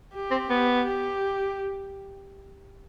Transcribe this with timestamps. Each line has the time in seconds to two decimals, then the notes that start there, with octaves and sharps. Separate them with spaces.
0.14 G4
0.31 C4
0.50 B3
0.86 G4